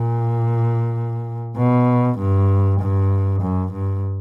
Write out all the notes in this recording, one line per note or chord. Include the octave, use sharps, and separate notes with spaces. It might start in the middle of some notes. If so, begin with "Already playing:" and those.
Already playing: A#2
B2
G2
G2
F#2
G2